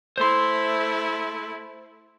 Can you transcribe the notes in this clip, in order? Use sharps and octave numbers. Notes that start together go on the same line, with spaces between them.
A3 E4 C5 C6